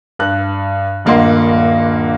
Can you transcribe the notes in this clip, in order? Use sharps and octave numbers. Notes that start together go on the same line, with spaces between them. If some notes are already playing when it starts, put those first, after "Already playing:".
G2 F#6
D#1 G2 A#3 D#5 F#5 C6